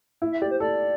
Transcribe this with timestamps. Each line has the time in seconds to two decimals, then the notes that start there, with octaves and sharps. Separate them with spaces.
0.22 E4
0.32 E5
0.41 G4 D5
0.51 C5
0.60 A4 D5